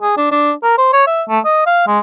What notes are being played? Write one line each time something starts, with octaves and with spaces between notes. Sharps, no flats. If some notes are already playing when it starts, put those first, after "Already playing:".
G#4
D4
D4
A#4
C5
C#5
E5
A3
D#5
F5
G#3